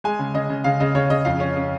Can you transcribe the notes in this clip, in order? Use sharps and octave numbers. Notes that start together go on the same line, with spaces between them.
G#3 G#5
C#3
C#3 D#5
C#3
C#3 F5
C#3 D#5
C#3 C#5
C#3 D#5
F2 F5
C#4
C#4